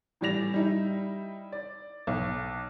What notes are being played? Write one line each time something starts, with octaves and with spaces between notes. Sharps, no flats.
A2 E3 G3 D5 A#6 F7
G3 D#4 E4
D5
B1